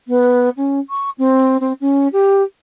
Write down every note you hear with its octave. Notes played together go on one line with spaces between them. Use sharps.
B3
C#4
C#6
C4
C4
C#4
G4